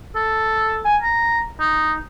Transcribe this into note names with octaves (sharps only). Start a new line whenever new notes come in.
A4
G#5
A#5
D#4